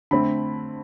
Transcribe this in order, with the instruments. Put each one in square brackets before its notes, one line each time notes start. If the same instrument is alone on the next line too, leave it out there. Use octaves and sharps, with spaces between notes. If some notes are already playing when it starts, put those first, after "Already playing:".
[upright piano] D3 A3 C4 B5